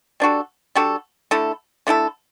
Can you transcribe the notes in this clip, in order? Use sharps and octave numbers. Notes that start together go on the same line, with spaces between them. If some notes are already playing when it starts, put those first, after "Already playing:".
G3 D4 F#4 A4
G3 D4 F#4 A4
D3 A3 E4 A4
D3 A3 E4 A4